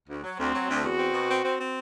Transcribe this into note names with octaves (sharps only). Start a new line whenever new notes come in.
D2
F#3
D2 C4
F#3
D2
E2 F#4
C4
B2
C4
C4
C4